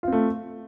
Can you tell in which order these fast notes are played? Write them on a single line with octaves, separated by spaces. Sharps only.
F4 C4 A3